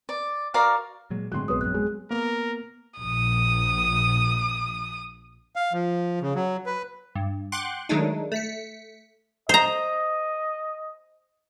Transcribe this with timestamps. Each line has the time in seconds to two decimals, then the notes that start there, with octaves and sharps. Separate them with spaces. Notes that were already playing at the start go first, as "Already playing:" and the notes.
0.09 D5
0.54 F#4 A#4 D5 F5
1.10 A#2 F#3 G#3
1.32 A2 D3 F#3 G#3 C4 C6 F#6
1.48 B1 G2 F#3 G#3 B3 B4 C#5 D#6
1.61 A#1 F#2 F#6
1.74 G#3
2.11 A#3 B3 A#4
2.99 A#1 D#6
5.56 F5
5.73 F3
6.21 C#3
6.35 F#3
6.66 B4
7.15 G2
7.52 F#5 G5 C6 D6 F#6
7.89 D#3 F#3 G#3 A3 D4 D#4
8.32 A3 B6 C#7
9.49 C5 D#5 A#5